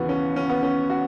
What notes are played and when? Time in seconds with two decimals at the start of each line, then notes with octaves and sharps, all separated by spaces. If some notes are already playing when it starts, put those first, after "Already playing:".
Already playing: D#2 C#3 E3 B3 F#4
0.09 C#4
0.36 C#4
0.49 B3
0.63 C#4
0.90 F#4